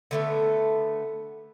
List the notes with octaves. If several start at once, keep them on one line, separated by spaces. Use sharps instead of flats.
D3 A3 B3